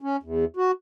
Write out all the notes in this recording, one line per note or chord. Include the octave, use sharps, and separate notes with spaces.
C#4
E2
F#4